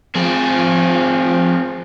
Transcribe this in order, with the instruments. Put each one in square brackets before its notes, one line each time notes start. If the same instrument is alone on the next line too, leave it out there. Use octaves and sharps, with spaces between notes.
[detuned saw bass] F3 [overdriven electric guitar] C4 G#4